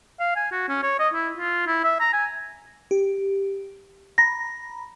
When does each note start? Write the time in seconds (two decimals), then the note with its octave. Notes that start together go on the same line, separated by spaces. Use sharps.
0.20 F5
0.36 G#5
0.52 F#4
0.69 C#4
0.83 C#5
0.99 D#5
1.14 E4
1.38 F4
1.67 E4
1.84 E5
2.00 A#5
2.13 G#5
2.91 G4
4.18 A#5 B5 A#6